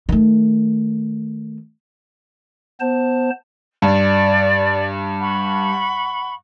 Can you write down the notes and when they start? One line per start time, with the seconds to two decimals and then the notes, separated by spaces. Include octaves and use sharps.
0.09 D#3 A3
2.80 B3 C5 A5
3.82 G2 D5
5.20 F#5 B5 C#6